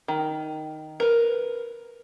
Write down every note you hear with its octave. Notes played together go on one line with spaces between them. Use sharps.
D#3
A#4 B4